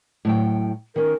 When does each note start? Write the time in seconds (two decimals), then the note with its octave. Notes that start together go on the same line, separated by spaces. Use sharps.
0.25 A2 F#3 G5
0.96 D#3 C#4 A#4